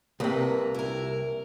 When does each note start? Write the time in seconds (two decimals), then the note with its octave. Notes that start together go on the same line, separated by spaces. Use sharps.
0.20 C2 C3 A#3 B4
0.75 E4 A#4